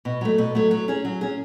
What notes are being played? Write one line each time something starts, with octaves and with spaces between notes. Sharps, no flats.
B2
F#3 A3
B2
F#3 A3
F#3
C#4 G#4
F#3
C#4 G#4